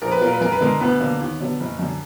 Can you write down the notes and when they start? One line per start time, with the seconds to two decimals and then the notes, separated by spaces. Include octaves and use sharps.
0.02 A#1 A#4
0.12 B4
0.21 A#2 F#3 A#4
0.33 B4
0.41 F#2 A#4
0.52 B4
0.61 D3 G#3 A#4
0.80 D2 B3 B4
1.00 D3 F#3 A#3
1.20 D#2
1.40 D3 F#3 B3
1.60 F#1
1.79 F#2 D3